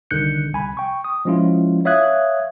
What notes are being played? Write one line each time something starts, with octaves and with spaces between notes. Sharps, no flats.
C2 D3 D#3 F#6 G6 C#7
C2 G#5 B5
G5 C#6
D#6
F3 G#3 C#4 E4 F4
C#5 E5 F5 D#6 F#6 G#6